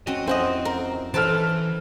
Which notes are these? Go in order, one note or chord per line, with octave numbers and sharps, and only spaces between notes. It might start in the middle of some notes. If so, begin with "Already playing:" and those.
C4 C#4 F#4 D#5
F2 C4 E4 F#4 C5 D#5 G#5
A#4
E3 A4 B4 C5 A5 F6 D7